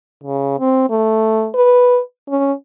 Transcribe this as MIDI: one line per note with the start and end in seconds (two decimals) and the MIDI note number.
0.24 0.57 49
0.59 0.87 60
0.90 1.49 57
1.54 2.00 71
2.29 2.52 61